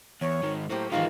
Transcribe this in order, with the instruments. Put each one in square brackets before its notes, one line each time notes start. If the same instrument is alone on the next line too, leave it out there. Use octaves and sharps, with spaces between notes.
[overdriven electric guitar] E2 [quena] C#5
[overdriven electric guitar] G#2 D#3
[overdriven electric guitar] A2 [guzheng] F#3 A#3 G4 [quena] C5
[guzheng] G#2 D#3 E3 [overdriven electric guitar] G#3 F4 [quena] F5